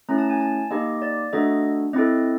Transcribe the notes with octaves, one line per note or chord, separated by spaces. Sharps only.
A3 C#4 E4 A#5
A5
G#5
A5
A#3 D#4 G4 D#5
D5
A3 D4 F#4 A4 D#5
C4 E4 A4 D#5